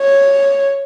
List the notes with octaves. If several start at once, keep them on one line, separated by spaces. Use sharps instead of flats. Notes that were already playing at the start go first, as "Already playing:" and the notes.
Already playing: C#5